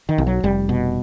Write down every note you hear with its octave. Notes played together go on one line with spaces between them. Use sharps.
D#3
B1
F#3
F1 G3
B2